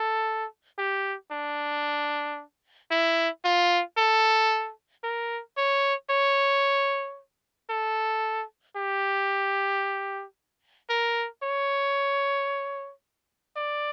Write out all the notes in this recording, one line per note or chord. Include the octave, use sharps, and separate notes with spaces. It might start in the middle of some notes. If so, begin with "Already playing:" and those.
Already playing: A4
G4
D4
E4
F4
A4
A#4
C#5
C#5
A4
G4
A#4
C#5
D5